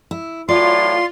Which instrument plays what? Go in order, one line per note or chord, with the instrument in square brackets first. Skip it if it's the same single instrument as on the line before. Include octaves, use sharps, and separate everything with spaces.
[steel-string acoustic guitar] E4
[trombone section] A2 E3 F#3 [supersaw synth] F4 [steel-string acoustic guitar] D5 [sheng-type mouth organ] C6